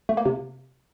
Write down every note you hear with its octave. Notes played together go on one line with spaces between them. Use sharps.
A3
A#3
C3